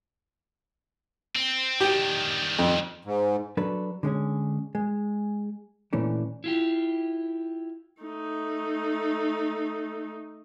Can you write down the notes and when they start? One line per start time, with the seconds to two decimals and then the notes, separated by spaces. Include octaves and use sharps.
1.36 C4
1.80 D#3 G3 G4
2.59 F2
3.05 G#2
3.57 F#3 D4 A4 B4
4.03 D3 G#3 C#4 G#4
4.75 G#3
5.93 A#2 E3 A3 C#4 D4
6.44 E4 F4 G4
8.02 A3 D#4